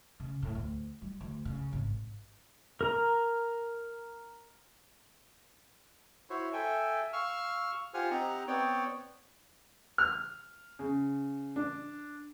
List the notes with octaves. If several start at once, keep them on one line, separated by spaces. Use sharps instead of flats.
C#3
A2
D2
G3
D2
C#3
G#1
A#4 A#5
E4 F#4 C5 C#5
A4 E5 G5 G#5
F5 C#6 E6 F6
F4 G4 C5 F#5 G#5 F6
C4 D#4 G4 F#5 A#5
B3 C4 C#5 D5 G5
F6
C#3
D4